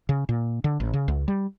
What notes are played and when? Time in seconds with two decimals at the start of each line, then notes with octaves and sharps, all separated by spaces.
0.09 C#3
0.29 A#2
0.64 D3
0.80 A1
0.94 C#3
1.08 C#2
1.28 G3